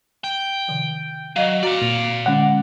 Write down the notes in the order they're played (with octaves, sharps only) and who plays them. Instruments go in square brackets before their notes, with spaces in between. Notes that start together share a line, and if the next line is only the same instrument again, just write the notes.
[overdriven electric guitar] G5
[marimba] C3 D#3 F3
[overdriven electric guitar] F#3 [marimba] D#5 F5
[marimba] F#4 A#5 [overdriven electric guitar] D5 F5
[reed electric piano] A#2
[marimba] D3 G#3 C#4 [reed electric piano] F#5